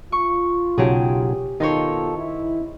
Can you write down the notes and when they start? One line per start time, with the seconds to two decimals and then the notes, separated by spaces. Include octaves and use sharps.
0.12 F4 C#6
0.78 B1 C#3 F#3 G4 G#4
1.60 B2 D#3 D#4 F4 A4 C5 C#5
2.18 E4